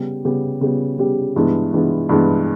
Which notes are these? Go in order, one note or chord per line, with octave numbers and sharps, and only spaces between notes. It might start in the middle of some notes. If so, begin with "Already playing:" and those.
Already playing: C#3 G3 B3 G4
C#3 G3 B3 G4
C#3 G3 B3 G4
C#3 G3 B3 G4
G2 E3 G#3 B3
G2 E3 G#3 B3
G2 E3 G#3 B3